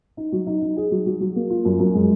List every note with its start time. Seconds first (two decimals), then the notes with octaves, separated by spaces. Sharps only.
0.17 D#4
0.32 F#3
0.47 D#4
0.62 D#4
0.77 G#4
0.91 F#3
1.06 F#3
1.20 F#3
1.36 A#3
1.50 F4
1.65 F#2
1.80 F#2
1.94 G#3